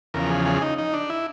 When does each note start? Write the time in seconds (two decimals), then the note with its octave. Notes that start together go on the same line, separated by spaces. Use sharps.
0.14 E2 C#3 F3 A#4
0.30 G#4
0.46 G#4
0.62 D#4
0.78 D#4
0.93 D4
1.10 E4